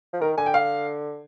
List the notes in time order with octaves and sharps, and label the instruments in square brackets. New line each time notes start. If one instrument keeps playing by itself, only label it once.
[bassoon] F3
[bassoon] D#3 [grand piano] A#4
[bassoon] D3 [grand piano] G#5
[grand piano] G5
F5